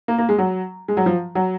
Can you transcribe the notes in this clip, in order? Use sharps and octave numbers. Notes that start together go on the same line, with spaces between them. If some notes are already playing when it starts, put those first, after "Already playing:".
A#3
A#3
G#3
F#3
G#3
F#3
F3
F#3